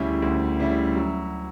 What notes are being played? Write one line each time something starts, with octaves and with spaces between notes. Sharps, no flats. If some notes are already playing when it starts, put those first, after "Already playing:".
Already playing: D2 C#3 G3 C#4 E4
D2
C#3 G3 C#4 E4
F#3